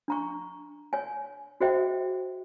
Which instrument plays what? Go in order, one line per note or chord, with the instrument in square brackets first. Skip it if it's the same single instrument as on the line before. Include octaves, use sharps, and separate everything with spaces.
[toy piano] D4 A#5 C#6
C#5 G#5
F#4 G#4 C5 D#5 E5 G5